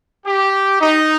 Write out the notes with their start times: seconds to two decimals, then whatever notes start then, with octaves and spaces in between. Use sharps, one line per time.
0.25 G4
0.80 D#4